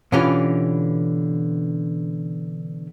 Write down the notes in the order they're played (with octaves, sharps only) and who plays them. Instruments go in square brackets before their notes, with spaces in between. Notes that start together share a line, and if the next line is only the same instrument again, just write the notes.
[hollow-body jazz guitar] B2 D3 E3 C#4 F4 G4